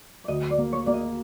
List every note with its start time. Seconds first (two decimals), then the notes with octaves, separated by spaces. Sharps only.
0.24 D5
0.28 D2 D#5
0.51 D5
0.58 A#3
0.73 C#5
0.86 A#3 D5
0.94 D#5